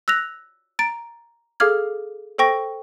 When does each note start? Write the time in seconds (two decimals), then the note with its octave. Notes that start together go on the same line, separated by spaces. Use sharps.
0.08 E6 F#6 A#6 F7
0.79 A#5 A6 D7
1.60 G#4 A4 F5 D6 F6 G#6
2.38 A4 C5 G5 C#6 A#6